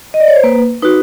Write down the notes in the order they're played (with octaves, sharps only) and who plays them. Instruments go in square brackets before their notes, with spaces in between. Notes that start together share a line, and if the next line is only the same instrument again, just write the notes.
[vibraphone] D#5
D5
C#5
C5
A#3 B4
D#4 F#4 B4